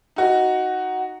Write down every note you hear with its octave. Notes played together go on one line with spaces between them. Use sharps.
D#4 F#4